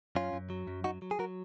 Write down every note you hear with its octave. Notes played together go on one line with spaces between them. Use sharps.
F#2 C#4 F4
F#2
F#3
F#2
F#3 D#4 F#4
F#3
G#4
F#3 F#4 A#4